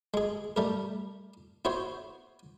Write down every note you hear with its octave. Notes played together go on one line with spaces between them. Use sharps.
G#3 G#4
G3 A3 A#4
E4 F#4 C5 C#5